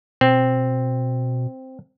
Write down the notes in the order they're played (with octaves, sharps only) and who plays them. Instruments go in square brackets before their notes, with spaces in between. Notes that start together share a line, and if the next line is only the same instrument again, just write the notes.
[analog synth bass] B2 [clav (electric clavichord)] C4